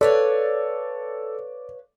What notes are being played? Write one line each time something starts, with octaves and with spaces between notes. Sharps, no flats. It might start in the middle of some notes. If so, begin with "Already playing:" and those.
A4 B4 C#5 D5 F5